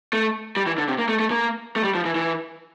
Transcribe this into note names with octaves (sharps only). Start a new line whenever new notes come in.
A3
G3
E3
D3
C3
A#3
A3
A3
A#3
A3
G3
F3
E3
E3